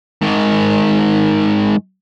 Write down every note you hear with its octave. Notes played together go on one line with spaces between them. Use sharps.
G#2 D#3